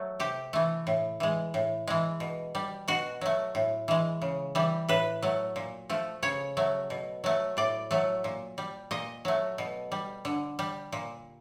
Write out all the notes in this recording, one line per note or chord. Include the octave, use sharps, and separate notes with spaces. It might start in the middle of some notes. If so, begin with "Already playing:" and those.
Already playing: F#3 A3
C3 G4
E3 A3
A2
E3 G#3
A2
E3 G#3
B2
G3
B2 F#4
F#3 A3
A2
E3 G#3
C#3
E3 G3
A2 B4
F#3 A3
A#2
F3 A3
C#3 C#5
F#3 A3
B2
F#3 A3
A2 D5
F#3 A3
A#2
G3
A#2 D#5
F#3 A3
B2
G3
D3
G3
A#2